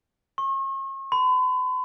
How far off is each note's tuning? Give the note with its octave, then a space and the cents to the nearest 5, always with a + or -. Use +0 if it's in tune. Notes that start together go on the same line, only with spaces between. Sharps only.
C#6 -40
B5 +45